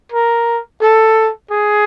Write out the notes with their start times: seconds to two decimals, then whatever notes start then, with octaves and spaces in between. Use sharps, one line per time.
0.12 A#4
0.82 A4
1.51 G#4